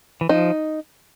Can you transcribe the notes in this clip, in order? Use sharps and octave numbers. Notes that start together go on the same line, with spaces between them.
E3
F3 D#4